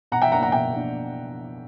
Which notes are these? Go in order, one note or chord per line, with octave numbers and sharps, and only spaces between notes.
B2 F#5 A#5
E5 G5
A#3 D4 F#5 A#5
F#5 A#5
B2 E5 G5
A#3 D4